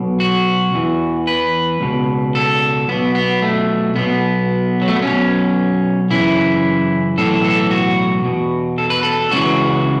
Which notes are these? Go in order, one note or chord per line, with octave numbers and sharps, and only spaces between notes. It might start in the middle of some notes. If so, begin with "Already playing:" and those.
Already playing: B1 B2
F#4
E2 E3
B4
C#2 B2
A4
B1 B2 B3
B3
A3
B1 B2 B3
F#3
A3
B3
B1 B2 C#4
F#2 C#3 E3 E4
B1 A2 E3 A4
A4
F#4
E2 B2
A4
B4
A4
C#2 C#3 E3 F#4